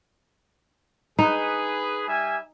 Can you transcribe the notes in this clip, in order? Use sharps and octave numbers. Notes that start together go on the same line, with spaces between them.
D#4 G#4 B4
G3 E5 G#5